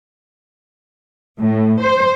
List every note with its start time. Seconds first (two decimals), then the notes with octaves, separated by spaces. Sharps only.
1.39 A2
1.83 C5